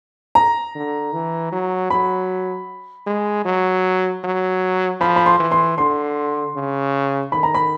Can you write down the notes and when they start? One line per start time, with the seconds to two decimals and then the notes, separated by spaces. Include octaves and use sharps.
0.35 A#5
0.75 D3
1.13 E3
1.52 F#3
1.90 F#3 B5
3.06 G#3
3.45 F#3
4.24 F#3
5.00 F3 B5
5.16 B5
5.26 C6
5.39 E3
5.52 C6
5.77 D3 C6
6.55 C#3
7.32 D#3 B5
7.43 A#5
7.54 B5